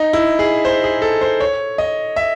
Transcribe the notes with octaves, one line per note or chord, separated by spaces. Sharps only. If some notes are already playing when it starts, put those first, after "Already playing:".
Already playing: D#4
E4
G#4
C5
G#4
A4
C5
C#5
D#5
E5